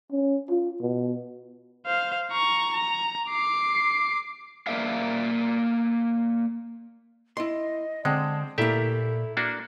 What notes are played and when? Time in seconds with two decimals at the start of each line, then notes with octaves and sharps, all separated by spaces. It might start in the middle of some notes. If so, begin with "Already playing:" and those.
0.12 C#4
0.50 F4
0.81 B2
1.86 C5 F5
2.32 A#5 C#6
2.73 A#5
3.29 D6 C7
4.67 A#3 A#4 D5 E5 F5
7.37 E4 D#5 C6
8.05 D3 G#3 C4 F#5 G5 A5
8.58 A#2 A3 A#3 E4 G4 A4 E5
9.37 A#3 D4 F#4